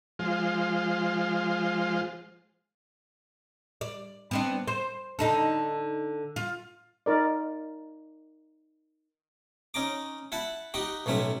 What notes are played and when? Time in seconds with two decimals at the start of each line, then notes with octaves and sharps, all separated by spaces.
0.19 F3 G#3 F4 C5
3.81 D5
4.31 B3 C4 D4
4.68 C5
5.19 D3 D#4 A4
6.36 F4
7.06 D#4 A#4 D5
9.74 C#4 D#4 A#5 D6
10.32 E4 F#5 A5
10.74 D#4 F#4 G4
11.06 B1 A2 F#3 C#4 E5